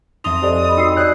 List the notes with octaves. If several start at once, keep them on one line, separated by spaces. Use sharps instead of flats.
F2 D#4 E5 C6 D#6 F7
G4 A4 C5 D5 D#5 G#5
D#5 B5
D#4 F#4 G5 E6 C7
G4 C#5 D5 G#5 E6 F#6 G6